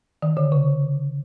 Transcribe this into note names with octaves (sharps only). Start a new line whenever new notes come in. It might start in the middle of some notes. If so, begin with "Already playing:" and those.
D#3
D3
C#3